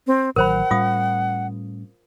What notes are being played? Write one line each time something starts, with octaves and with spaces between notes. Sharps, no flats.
C4
A1 D#3 F#3 A#4 C5 F#5 B5
A2 G3 C#4 F4 F5 D#6